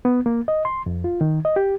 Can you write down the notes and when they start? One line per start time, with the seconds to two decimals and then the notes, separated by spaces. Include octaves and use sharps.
0.05 B3
0.26 A#3
0.48 D#5
0.65 C6
0.86 F2
1.04 F4
1.21 D#3
1.45 D#5
1.56 G4